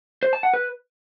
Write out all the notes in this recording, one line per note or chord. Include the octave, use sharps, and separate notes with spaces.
C5
A5
F#5
B4